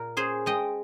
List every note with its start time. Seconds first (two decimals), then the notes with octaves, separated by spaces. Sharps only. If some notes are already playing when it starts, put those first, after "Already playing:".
Already playing: A#2 A#4
0.17 C#4 G#4 C5
0.46 G#3 D#5 G5